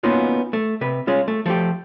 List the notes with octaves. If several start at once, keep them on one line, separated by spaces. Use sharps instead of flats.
A#3 B3 C#4 D#4 F4 F#4
A3
C3 B4
G#3 C#4 F4
A3
F3 A3 G4